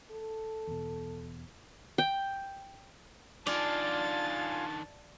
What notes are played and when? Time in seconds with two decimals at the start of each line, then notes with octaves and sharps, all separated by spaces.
0.11 A4
0.67 E2 B2
1.98 G5
3.47 D#3 D4 F4 D5 F5 G#5 A5 A6